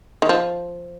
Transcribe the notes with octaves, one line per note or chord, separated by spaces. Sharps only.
D#3
F3